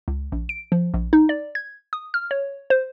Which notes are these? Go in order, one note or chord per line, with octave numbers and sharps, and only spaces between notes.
C#2
A#1
D7
F3
A#1
D#4
D5
G#6
D#6
F6
C#5
C5